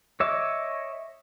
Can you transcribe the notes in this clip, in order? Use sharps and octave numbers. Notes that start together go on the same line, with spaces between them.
C#5 D#5 E5 D6